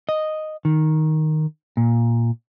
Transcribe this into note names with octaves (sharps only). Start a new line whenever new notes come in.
D#5
D#3
A#2